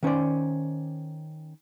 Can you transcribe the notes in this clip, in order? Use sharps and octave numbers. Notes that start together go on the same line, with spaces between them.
D#3 C#4 C5 D5